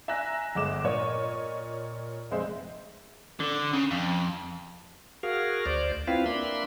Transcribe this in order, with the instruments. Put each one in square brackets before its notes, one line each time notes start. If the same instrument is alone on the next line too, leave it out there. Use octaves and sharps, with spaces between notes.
[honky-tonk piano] E5 G#5 A#5 F#6 A#6
G1 G#3 D6 E7
A#2 C#5 D#5
F1 G#3 C5 E5
[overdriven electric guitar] D3
C#3
F2
[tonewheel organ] F#4 G#4 A#4 F5
D2 C5 D5
C4 E4 F4 B4 F5
A#3 D4 E5 B5 C6